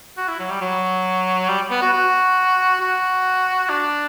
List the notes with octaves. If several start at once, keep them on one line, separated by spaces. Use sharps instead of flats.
F#4
E4
F#3
G3
F#3
G3
B3
F#4
F#4
F#4
D4